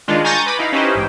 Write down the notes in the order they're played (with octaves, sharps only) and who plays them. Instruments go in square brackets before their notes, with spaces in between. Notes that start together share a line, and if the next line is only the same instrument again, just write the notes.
[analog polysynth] D#3 G#3 D4 F4
G#5 A#5 C#6 G6 A6 A#6
B4 B5 D6
D#4 E4 F5
C#4 D#4 E4 G4 B4 C5
A1 G#2 G5